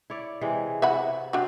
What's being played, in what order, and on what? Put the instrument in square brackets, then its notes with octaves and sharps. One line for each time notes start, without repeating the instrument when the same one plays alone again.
[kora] E4 C#5 D5
C3 E3 G#3
[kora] C3 F#4 [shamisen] E5 F#5 B5
[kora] C3 C4 [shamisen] D4 F#4